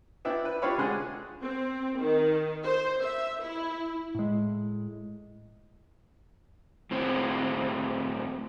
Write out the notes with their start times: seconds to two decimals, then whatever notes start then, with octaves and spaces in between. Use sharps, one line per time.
0.25 B3 D4 E4 E5 G5
0.45 B4
0.62 D4 F4 G4 C#5 F5 B5
0.78 D3 G#3 F#4 G#4 F#5 C6
1.43 C4
1.99 D#3
2.65 C5
3.03 E5
3.42 E4
4.15 A2 G#3
6.91 A2 C4